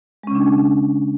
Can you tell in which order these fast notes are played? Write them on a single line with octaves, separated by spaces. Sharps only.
G#3 C#4 C#3 D4